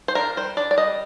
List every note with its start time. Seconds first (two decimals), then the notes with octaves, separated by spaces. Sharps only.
0.08 C5
0.15 D4 A#4
0.37 G3 C5
0.57 D4 D5
0.71 D5
0.78 G3 D#5